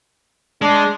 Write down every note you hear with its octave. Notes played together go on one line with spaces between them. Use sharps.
G#3 D4